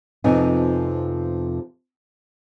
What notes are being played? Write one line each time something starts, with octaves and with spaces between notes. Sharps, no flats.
F2 C3 F3 B3 D#4 G#5